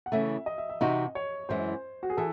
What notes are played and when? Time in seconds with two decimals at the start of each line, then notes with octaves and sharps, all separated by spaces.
0.06 F#5
0.12 C#3 E3 A3 E5
0.46 D#5
0.58 E5
0.69 E5
0.81 C3 E3 C4 D#4 F#4 D#5
1.15 C#5
1.49 F#2 E3 G#3 C4 C5
2.03 F#4
2.10 G#4
2.17 E3 A4